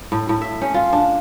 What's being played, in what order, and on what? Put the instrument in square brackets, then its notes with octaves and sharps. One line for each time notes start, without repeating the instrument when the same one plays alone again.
[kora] A2
A2
E5
C#4
F4
D4